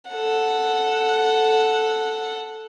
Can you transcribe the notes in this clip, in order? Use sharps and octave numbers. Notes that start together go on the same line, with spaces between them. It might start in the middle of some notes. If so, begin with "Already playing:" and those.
A4 F#5